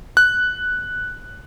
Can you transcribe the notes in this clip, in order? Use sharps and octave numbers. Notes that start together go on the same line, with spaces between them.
F#6